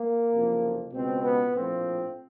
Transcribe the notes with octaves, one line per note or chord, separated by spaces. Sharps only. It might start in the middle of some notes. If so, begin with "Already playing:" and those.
Already playing: A#3
F#1 F2 C3 F3
C#2 B2 C4
B3
A#1 A2 F3 C4